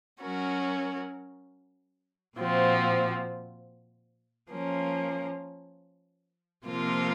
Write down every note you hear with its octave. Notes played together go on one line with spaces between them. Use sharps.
F#3 C#4 F#4 A#4
A#2 F3 C4 F#4
F3 A#3 C#4
C3 F3 A#3 F4 A#4